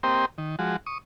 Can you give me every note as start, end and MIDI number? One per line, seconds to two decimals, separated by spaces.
0.03 0.25 58
0.03 0.25 60
0.03 0.25 67
0.03 0.25 72
0.03 0.25 75
0.03 0.25 79
0.38 0.56 51
0.59 0.76 53
0.59 0.76 56
0.59 0.76 66
0.86 0.98 85
0.86 0.98 87